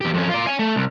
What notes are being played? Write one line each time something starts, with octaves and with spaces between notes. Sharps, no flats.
E2 G4
F2 C#4
F4 D5
C#5 G#5
A3
C2